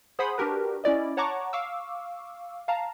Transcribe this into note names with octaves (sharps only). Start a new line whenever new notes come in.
G#4 C5 F#5 B5 C6 D#6
D4 F#4 G4 A#4 B4
C#4 E4 D5 D#5
C#5 F#5 A5 A#5 C#6 D6
F5 C#6 D6 E6
F5 A5 A#5